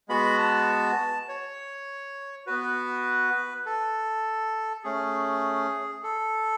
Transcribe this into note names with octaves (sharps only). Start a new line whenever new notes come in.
G#3 B3 F#4 B5
A5
C#5
B3 F#4 B4
A4
A3 C#4 G#4
A4